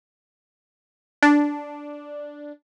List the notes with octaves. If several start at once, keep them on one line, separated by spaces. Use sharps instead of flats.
D4